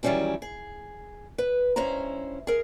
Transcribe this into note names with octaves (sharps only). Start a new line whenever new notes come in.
D#3 E3 F#3 G3 C#4 E4
G#4
B4
G2 C#4 E4 C5 A#5
G#4 A#4